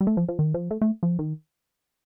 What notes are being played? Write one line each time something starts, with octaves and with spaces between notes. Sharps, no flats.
G3
A3
F3
F3
D#3
F3
A3
A3
F3
D#3